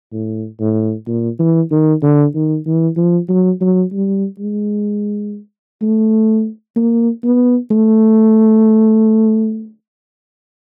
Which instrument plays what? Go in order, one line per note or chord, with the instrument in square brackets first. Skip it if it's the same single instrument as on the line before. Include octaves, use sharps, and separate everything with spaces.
[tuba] A2
A2
A#2
E3
D#3
D3
D#3
E3
F3
F#3
F#3
G3
G#3
A3
A#3
B3
A3